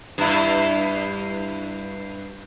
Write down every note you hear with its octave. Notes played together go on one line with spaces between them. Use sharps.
G2 E4